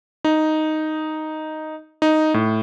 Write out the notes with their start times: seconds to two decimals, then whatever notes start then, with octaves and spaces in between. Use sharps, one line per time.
0.25 D#4
2.02 D#4
2.34 A2